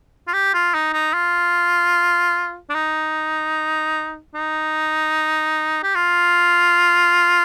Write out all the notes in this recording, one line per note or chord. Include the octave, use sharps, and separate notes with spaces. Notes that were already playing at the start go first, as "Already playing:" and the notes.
F4
G4
F4
D#4
D#4
F4
D4
D#4
D#4
G4
F4